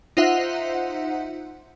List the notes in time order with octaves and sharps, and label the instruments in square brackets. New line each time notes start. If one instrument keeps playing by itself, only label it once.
[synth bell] D#4 F4 C5 E5 F#5